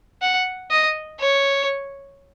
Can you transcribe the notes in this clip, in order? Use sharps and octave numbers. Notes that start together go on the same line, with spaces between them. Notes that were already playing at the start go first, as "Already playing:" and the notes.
F#5
D#5
C#5